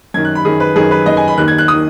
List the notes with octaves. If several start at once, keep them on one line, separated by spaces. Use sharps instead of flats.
F#2 D#3 G#6
F#6
B5
F#2 D#3 G#4
B4
F#2 D#3 G#4
B4
F#2 D#3 D#5
G#5
B5
D#2 D#3 F#6
G#6
F#6
D#6
D#3